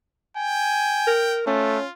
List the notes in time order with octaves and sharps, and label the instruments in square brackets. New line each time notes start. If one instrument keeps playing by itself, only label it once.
[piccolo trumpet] G5 [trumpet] G#5
[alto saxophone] A#4
[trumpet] A3 [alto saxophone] C#4 [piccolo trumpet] F4